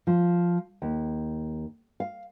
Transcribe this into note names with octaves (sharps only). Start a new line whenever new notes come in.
F3
D#2
F5